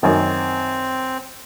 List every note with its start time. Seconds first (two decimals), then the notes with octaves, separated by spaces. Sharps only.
0.03 F#2 D#3 C4